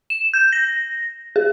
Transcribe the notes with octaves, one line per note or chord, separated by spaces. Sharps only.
E7
G6
A#6
G#4